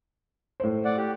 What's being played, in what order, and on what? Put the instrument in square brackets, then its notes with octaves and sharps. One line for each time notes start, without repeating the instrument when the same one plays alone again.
[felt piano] A2 C5
[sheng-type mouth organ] D5 F#5
G4